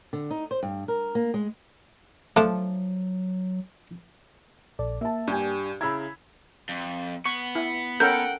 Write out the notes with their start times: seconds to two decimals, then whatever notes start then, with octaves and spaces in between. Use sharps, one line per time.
0.13 D3
0.31 D#4
0.51 C5
0.63 G2
0.88 A#4
1.15 A#3
1.34 G#3
2.36 F3 F#3 A3 D4
4.79 A#1 A4 D5
5.01 A#3 E5 A5
5.28 G2 D4 G4 G#5 G6
5.81 C#3 E4 A#5 B5 E6 G#6
6.69 F2
7.26 B3 C#6
7.55 E4
8.00 C#4 A4 A#4 F#5 G5 G6